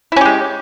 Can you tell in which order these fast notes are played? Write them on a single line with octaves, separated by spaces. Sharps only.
E4 C#4 G4 G#3